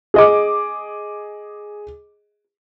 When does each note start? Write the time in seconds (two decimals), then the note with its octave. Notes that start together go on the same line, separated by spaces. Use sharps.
0.14 G#4 D#5 D6